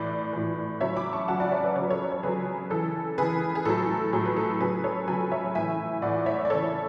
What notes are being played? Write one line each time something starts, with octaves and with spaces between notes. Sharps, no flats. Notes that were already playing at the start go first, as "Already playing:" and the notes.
Already playing: A2 E3 B4 D5
A2 E3
C#3 F#3 C#5 E5
B5 D6
A5 C#6
C#3 F#3 F#5 A5
D5 F#5
C#5 E5
B4 D5
C#3 F#3 B4 C#5
A4 C#5
C#5
C#3 F#3 G#4 B4
C#3 E3 A4
C#3 E3 G#4 B4
G#4
A2 F#3 A4
A2 F#3 G#4
B4
A4
C#3 F#3 G#4 B4
A4 C#5
C#3 F#3 G#5 B5
C#5 E5
A2 E3 E5 G#5
A2 E3 D5 F#5
C#5 E5
D5
C#3 E3 A4 C#5